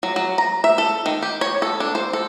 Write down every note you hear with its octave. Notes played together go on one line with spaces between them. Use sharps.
F#3
F#3
A#5
E5
A4
D#3
G4
C#5
A4
D4
C5
A4